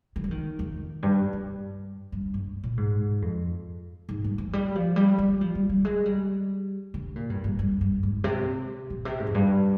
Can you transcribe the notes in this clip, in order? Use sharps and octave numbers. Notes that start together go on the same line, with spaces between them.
D#3
F3
D#3
F2
G2
G2
G2
G2
A#2
G#2
F2
G#2
G2
F3
G3
F3
G3
G3
F3
G3
G3
G#3
G3
D3
A#2
G2
G2
G2
G2
G#2
C3
A#2
C3
G#2
F2
G2